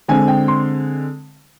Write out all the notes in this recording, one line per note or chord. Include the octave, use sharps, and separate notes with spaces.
D3 G#3 C4 G#5
G5
C6